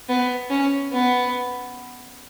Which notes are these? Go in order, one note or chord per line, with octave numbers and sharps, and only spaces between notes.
B3
C#4
B3